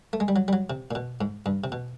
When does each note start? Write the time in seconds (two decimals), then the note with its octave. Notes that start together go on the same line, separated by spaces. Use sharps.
0.13 A3
0.20 G#3
0.28 G3
0.36 F#3
0.48 G3
0.53 F#3
0.70 C3
0.91 A#2
0.95 B2
1.21 G#2
1.46 G2
1.64 C3
1.72 B2